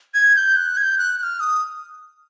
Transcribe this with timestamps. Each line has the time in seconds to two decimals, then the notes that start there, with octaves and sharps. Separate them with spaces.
0.14 G#6
0.36 G6
0.56 F#6
0.77 G#6
0.82 G6
0.98 F#6
1.18 F#6
1.23 F6
1.40 D#6